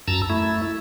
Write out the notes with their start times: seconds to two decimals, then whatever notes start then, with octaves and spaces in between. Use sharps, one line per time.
0.08 F#2 A5 A#5 E6
0.30 A3 E4